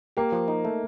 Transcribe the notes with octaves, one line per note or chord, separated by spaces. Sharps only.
A#3 G4
F3
D#4
A3